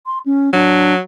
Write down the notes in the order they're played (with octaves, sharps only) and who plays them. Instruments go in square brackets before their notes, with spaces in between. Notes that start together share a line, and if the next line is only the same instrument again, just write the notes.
[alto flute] C6
C#4
[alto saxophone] F#3 [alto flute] D4